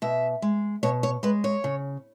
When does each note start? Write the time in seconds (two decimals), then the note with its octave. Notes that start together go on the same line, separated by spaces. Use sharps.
0.02 B2 E5
0.42 G#3
0.83 B2 C#5
1.03 C#5
1.23 G#3 B4
1.44 C#5
1.64 C#3